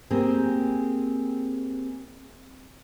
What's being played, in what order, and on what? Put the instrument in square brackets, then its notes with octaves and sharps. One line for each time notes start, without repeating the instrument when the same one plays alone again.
[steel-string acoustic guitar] A#3 C4 G4 G#4